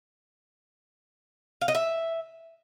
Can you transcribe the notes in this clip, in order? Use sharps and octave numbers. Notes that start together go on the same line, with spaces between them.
F5
D#5
E5